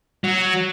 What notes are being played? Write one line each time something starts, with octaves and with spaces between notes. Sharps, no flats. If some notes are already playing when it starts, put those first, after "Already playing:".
F#3